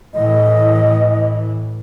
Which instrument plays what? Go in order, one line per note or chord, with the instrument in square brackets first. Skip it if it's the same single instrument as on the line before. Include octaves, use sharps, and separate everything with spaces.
[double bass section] A2 E3 [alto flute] D#5